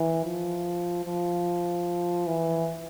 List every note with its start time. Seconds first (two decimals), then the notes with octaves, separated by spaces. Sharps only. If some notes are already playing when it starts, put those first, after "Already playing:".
Already playing: E3
0.25 F3
1.05 F3
2.27 E3